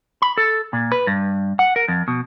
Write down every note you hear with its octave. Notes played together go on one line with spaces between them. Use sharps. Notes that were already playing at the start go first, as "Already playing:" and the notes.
B5
A4
A#2
B4
G2
F#5
A#4
F2
B2